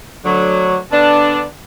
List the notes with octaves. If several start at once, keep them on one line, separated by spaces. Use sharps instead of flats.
D2 D3 F#3
D3 B3 D4